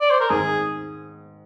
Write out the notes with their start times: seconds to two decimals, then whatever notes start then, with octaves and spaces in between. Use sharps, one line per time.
0.01 D5
0.10 C5
0.20 A#4
0.30 G#2 D#3 G#3 C4 G#4